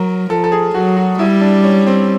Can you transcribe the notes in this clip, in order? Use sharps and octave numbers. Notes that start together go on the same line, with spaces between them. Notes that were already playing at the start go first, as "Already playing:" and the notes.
Already playing: F#3 A#4
F3 A4
A4
G#4
F#3 F#4
F#4
G3 E4
D4
C#4
C4